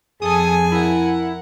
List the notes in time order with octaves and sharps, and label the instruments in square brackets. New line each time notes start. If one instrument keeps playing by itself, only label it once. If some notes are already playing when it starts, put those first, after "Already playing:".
[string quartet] F2 G#5 [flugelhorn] G#4 [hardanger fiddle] A4 [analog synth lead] D#6
[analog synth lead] E4 [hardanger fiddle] A#4 F#5